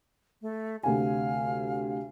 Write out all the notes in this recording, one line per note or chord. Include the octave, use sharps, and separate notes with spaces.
A3
D2 C3 F5 G#5